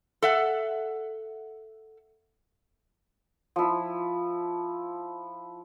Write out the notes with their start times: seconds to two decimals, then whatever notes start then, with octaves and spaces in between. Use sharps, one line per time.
0.22 A4 E5 F#5
3.56 F3 E4